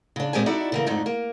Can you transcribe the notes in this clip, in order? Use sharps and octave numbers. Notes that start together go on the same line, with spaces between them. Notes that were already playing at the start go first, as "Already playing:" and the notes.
C#3 D4
A#2 G#3 C4 G4 G#5
D#4 E4 F#4 A4 D5
C#3 E3 A#3
F2 G#2 D3 A3 D#4
A#3